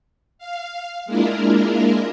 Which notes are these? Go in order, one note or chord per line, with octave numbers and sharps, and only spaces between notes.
F5
G#3 A#3 D4 E4 F4 A#4